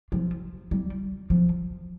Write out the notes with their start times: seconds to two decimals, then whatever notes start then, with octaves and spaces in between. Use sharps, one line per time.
0.12 F3
0.71 G3
1.30 F3